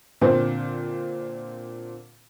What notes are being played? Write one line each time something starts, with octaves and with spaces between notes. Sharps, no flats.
A#2 D3 C4 C5